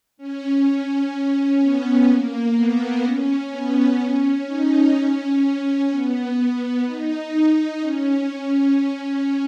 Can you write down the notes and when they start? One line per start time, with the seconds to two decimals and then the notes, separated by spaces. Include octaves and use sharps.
0.17 C#4
1.60 B3
2.08 A#3
2.55 B3
3.03 C#4
3.51 B3
3.99 C#4
4.46 D#4
4.94 C#4
5.90 B3
6.85 D#4
7.33 D#4
7.80 C#4